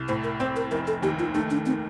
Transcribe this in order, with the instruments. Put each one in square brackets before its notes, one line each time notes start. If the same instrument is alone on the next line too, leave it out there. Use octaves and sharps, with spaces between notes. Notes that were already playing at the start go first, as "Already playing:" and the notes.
Already playing: [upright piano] C2
[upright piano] A2 [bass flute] C5
[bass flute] A#4
[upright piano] C4 [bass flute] C5
[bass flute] A#4
[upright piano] F1 [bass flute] A#4
[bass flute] A4
[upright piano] D#2 [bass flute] G4
[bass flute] F4
[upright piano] A3 [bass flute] D#4
[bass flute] D4
[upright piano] D#3 [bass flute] C4